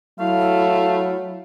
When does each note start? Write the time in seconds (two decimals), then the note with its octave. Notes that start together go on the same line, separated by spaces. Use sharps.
0.20 F#3 A3 E4 F5